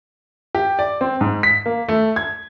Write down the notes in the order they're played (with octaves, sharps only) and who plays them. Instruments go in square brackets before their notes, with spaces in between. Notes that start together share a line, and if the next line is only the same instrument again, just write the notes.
[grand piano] G4
D5
C4
G#2
B6
A#3
A3
G#6